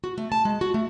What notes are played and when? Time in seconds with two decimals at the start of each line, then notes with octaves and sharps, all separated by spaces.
0.04 F#4
0.18 A3
0.32 A5
0.45 G#3
0.61 F#4
0.74 A3